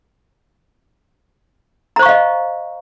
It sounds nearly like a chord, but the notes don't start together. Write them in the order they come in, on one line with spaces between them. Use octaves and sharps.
A#5 C5 C#6 F5 D#5